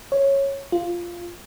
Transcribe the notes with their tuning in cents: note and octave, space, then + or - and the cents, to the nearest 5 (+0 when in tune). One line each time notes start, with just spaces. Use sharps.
C#5 -10
F4 -5